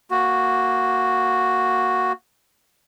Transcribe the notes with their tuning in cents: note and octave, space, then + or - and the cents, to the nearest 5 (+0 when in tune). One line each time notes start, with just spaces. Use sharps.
A#3 +0 F#4 +0